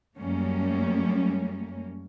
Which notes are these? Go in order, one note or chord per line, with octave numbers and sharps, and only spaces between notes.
F#2 G3 A3 A#3 C#4